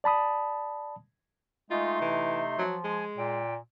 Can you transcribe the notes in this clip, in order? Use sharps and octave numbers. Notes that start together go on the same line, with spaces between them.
D5 A5 B5 D#6
G#3 A3 D#4 F4 C6
C3 E3
F3 F#3
G#3 G#5
A#2 G5